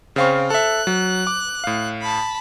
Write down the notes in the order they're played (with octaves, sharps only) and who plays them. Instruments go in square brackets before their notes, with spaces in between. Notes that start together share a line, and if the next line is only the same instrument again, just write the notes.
[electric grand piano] C#3 F5 C#6 [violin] C4
[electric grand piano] A4 E5 [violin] F#6
[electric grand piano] F#3
D6
A2 F5
[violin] A5 B5